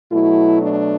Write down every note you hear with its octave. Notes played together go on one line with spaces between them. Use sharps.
B2 F#3 A3 E4
D4